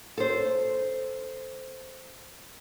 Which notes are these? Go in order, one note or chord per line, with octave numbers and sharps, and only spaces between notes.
A4 C5